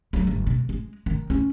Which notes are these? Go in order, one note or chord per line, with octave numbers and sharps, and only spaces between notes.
F#3 A3
G1
B2
G#3
D#3
C#4 E4